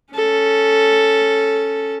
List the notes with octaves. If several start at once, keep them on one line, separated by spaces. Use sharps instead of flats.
C#4 A4